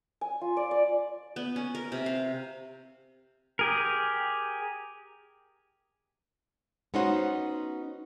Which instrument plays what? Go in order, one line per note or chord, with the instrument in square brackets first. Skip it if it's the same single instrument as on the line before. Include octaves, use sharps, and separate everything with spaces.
[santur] G#5
F4
D5
D5
[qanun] B3
C#4
A#4
C3
F5
[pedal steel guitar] G4 G#4 A#4
[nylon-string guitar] B3 C#4 D#4 F#4 C5 F#5